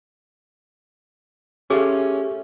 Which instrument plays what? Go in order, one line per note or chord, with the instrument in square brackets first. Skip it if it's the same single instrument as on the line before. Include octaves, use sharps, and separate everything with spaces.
[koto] A3 F4 [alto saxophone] C#4 [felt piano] G4 [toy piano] G#4